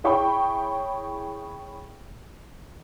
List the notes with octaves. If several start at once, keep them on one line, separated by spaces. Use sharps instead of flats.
E4 G#4 C#5 G5 B5 C#6